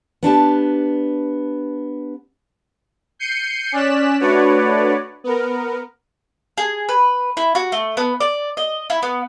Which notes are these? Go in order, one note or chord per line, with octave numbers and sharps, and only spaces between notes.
B3 D4 G4 A5
G6 C7 C#7 D#7
C#4 D5 F#6 B6 E7
A3 D4 F#4 B4 C#5 D5
B3 A#4
G#4
B4
E4
F#4
A3
B3
D5
D#5
E4
B3